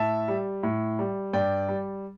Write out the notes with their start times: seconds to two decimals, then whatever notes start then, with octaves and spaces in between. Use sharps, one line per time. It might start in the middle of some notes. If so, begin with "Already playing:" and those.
Already playing: A2 E5 A5
0.28 G3
0.63 A2
0.99 G3
1.33 G2 D5 G5
1.68 G3